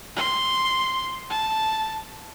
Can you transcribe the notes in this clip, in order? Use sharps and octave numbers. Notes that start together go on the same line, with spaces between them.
C6
A5